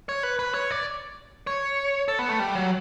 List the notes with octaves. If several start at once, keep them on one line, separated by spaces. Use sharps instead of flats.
C#5
B4
B4
C#5
D5
C#5
A4
B3
A3
G3
F#3